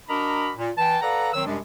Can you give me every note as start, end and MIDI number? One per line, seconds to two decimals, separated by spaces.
0.09 0.51 62
0.09 0.51 66
0.09 0.51 70
0.09 0.51 75
0.09 0.51 82
0.09 0.51 83
0.57 0.70 46
0.78 0.98 52
0.78 0.98 79
0.78 0.98 81
1.01 1.30 69
1.01 1.30 71
1.01 1.30 74
1.01 1.30 77
1.01 1.30 78
1.01 1.30 82
1.33 1.45 51
1.33 1.45 54
1.33 1.45 60
1.33 1.45 73
1.33 1.45 88
1.45 1.58 42
1.45 1.58 48
1.45 1.58 55
1.45 1.58 56
1.45 1.58 62